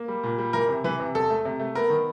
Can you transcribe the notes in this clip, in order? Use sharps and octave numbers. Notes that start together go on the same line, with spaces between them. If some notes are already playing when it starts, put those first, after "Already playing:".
Already playing: A#3
G3
A#2
G3
E3 A#4
C3
E3 B4
C3
E2 A4
A3
C3
A3
B3 A#4
D#3